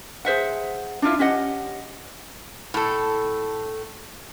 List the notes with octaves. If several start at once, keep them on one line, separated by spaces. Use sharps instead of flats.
G#4 C5 E5 F#5
D4 E4 F4 E5
C#4 G4 D#5 F#5
A2 A4